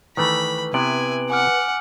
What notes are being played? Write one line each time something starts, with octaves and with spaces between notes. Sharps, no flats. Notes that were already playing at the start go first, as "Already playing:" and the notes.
D#3 E3 A3 B4 B5
C3 B3 E4 G#5 D7 F#7
F#5 G#5 D6 F6